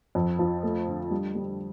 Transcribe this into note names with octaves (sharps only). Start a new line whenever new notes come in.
F2
F3
A3
D3
G3
G3